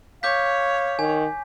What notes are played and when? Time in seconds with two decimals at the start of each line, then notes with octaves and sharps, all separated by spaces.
0.23 C#5 F5 D6 G6 B6
0.99 D#3 G#5